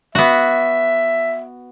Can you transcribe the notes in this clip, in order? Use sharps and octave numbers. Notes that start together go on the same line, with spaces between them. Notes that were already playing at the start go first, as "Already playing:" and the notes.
B3 F#4 E5